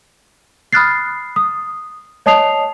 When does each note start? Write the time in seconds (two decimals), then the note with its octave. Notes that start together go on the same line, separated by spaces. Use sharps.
0.73 B5 D#6 F6 F#6 A6 C7
1.36 D#6
2.26 C#5 D#5 A5 D#6 C7 F7